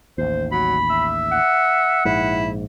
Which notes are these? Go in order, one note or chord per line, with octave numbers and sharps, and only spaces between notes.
A1 D#2 C5
F#3 B5
E5
F#5
A#1 G#2 E4